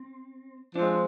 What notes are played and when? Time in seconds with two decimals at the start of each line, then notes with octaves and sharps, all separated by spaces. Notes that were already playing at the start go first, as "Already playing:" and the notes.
Already playing: C4
0.75 F3 G#3 C4 D4